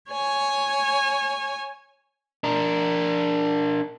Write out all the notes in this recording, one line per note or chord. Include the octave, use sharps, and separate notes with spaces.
C#5 G#5
D4 A#4